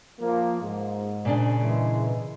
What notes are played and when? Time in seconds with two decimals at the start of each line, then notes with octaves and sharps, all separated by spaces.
0.21 F3 A#3
0.62 G#2
1.25 A#2 C#3 D4
1.62 E3 G#3